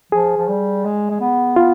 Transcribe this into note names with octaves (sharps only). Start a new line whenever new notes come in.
F3 G#4
F3
G3
G#3
G#3
B3
B3 F4